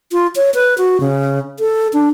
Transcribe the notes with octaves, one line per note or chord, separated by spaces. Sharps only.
F4
C#5
B4
F#4
C#3
A4
D4